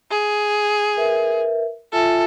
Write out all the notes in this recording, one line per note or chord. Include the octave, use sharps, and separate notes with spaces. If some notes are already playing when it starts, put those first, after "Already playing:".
G#4
A#4 B4 E5
F4 A4 E5 G#5